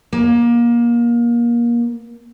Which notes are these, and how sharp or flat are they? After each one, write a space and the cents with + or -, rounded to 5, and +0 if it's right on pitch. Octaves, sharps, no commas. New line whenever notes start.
A#3 +25